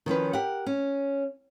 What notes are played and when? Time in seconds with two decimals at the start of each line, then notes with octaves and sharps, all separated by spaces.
0.06 D#3 F3 C#4 B4
0.33 G4 A#4 F#5
0.66 C#4